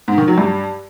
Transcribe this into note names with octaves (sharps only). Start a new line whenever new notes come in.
G#2
D#3
F#3
G2